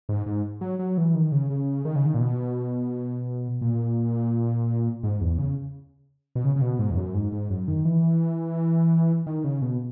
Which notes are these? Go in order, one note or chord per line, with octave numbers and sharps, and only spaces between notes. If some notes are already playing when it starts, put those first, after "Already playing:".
G#2
G#2
F#3
F#3
E3
D#3
C#3
C#3
D#3
C#3
D#3
A#2
B2
A#2
G#2
E2
C#3
B2
C#3
C#3
B2
G#2
E2
F#2
G#2
G#2
F#2
D#3
E3
D#3
C#3
B2